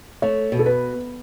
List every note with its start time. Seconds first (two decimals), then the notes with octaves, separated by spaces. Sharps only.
0.22 A3 C#5
0.52 B2
0.59 A4
0.66 B4